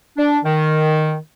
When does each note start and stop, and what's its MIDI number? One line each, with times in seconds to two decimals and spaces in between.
0.17 0.38 62
0.44 1.15 51